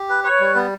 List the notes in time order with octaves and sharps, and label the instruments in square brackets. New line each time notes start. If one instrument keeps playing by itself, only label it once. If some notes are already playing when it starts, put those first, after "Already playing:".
Already playing: [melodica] G4
B4
[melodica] B4 [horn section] C#5
[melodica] G3
B3